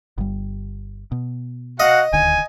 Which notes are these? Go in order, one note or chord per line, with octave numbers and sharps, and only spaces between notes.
G1 G3
B2
F#4 D#5 F5 F#5
D#1 D2 D#3 G#5